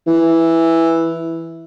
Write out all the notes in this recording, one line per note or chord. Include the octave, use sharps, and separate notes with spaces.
E3